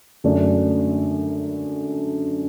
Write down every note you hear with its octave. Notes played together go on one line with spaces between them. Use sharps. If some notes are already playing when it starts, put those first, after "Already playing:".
F#2 D3 F#3 A3 D4